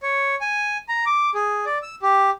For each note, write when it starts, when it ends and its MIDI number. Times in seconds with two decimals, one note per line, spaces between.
0.03 0.35 73
0.41 0.77 80
0.89 1.05 82
1.06 1.30 86
1.35 1.65 68
1.66 1.78 74
1.82 1.95 88
2.02 2.30 67